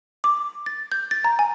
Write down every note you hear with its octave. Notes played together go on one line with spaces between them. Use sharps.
D6
A6
G6
A6
A#5
G#5